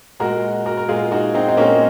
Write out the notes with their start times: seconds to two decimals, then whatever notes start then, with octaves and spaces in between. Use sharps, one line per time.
0.20 A#2 G#3 F#4 A#4
0.66 F#4 A#4
0.77 A#4
0.88 A#2 G#3 F4 G#4
1.12 D#4 F#4
1.34 C4 D#4
1.48 D#4
1.57 A#2 G#3 A#3 C#4